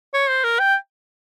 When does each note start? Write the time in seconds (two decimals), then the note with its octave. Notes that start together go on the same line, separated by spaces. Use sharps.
0.14 C#5
0.29 C5
0.44 A#4
0.59 G5